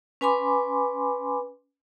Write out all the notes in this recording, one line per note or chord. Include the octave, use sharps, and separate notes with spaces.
C#4 B4 G#5 B5 C6 D6